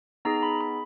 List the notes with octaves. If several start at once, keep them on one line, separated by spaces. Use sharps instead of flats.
B3 D#4 G#4 A#5
B5
B5